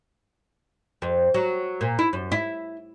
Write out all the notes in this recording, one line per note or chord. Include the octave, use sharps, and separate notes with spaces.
F2
F#3
A#2
E4
F#2
E4